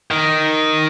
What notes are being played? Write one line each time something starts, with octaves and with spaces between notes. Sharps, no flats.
D#3